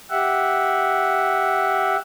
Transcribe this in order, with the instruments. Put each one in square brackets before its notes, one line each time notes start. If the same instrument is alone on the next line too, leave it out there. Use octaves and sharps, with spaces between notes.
[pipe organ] G4 E5 F#5